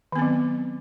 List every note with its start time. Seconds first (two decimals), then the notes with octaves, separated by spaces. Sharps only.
0.12 D#3
0.16 B3
0.19 C4
0.22 F#3